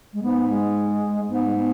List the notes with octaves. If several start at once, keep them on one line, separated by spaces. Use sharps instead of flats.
G#3
G#2 B3
G#3
G#2 B3
G#3
B3